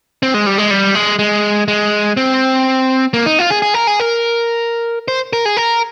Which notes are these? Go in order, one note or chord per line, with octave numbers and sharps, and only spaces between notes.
C4
G#3
G3
G#3
G3
G#3
G#3
G#3
C4
A#3
D#4
F4
G#4
G#4
A#4
G#4
A#4
C5
A#4
G#4
A#4